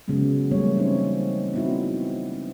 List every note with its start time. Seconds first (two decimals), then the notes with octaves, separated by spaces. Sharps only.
0.08 C#3 F#3 G#3 B3
0.51 E3 G3 A3 A#3 C#5
0.77 C4 C#4 D#4 C5
1.54 B3 C4 D#4 E4 F#4